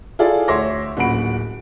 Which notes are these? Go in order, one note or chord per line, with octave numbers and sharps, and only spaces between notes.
E4 F4 G#4 A4 D5 F5
D2 C#5 E5 C6 D6 A#6
D1 A#2 C#4 F#5 B5 D7